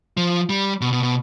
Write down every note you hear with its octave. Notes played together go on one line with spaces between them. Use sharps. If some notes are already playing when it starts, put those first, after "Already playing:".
F3
G3
B2
B2
B2